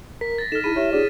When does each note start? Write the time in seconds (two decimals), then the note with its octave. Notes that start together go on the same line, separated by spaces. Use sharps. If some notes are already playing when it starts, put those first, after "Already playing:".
0.21 A#4 B6
0.38 A6 A#6
0.52 D#4 A4 F6 E7
0.64 E4 G#4 B5 D#7
0.76 E4 G4 C#5 E5
0.93 D4 F#4 G#4 D5